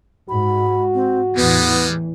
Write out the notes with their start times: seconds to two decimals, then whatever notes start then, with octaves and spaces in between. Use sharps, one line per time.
0.29 G#2 F#4 B5
0.94 C4
1.36 E2 A2 E3 G3 G#3 B3